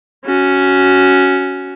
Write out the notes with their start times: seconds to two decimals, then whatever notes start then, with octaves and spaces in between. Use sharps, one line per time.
0.25 C#4 F#4